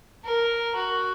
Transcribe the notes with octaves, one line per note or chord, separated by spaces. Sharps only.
A#4
F#4